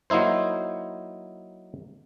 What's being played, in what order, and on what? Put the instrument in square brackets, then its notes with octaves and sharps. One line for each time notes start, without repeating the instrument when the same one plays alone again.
[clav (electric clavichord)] F#3 A#3 D#4 E4 C5